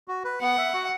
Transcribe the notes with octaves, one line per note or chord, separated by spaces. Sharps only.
F#4
B4
B3 F#5
E5
F#4